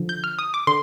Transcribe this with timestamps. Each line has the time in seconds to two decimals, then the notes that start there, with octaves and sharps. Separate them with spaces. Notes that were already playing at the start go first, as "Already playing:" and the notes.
Already playing: D3 F3
0.09 G6
0.24 F6
0.39 D#6
0.54 D6
0.67 D3 C6